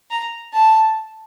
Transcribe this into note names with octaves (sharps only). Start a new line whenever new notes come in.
A#5
A5